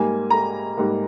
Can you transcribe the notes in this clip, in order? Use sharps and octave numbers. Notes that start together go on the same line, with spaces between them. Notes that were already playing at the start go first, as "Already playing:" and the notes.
Already playing: G#2 G3 A#3 G#5
A#5
G#2 G3 A#3